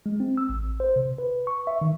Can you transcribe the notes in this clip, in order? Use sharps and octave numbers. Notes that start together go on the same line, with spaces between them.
G#3
C4
E6
A1
C5
C3
B4
C#6
E5
D#3